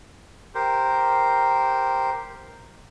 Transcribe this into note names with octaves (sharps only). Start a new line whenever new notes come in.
G4 A#4 C5